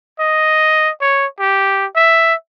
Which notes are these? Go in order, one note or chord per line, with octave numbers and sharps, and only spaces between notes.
D#5
C#5
G4
E5